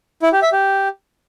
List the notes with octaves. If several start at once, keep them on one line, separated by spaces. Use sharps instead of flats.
E4
G4
E5
G4